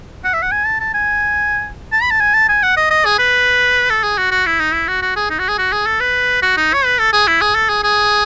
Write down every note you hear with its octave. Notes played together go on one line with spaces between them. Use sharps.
F#5
E5
F#5
G#5
A5
A5
G#5
A5
B5
A5
G#5
A5
G#5
F#5
D#5
D#5
G#4
B4
A4
G#4
F#4
F#4
E4
D#4
E4
F#4
F#4
G#4
D#4
F#4
G#4
F#4
G#4
A4
B4
F#4
D#4
C#5
B4
A4
G#4
E4
G#4
A4
G#4
G#4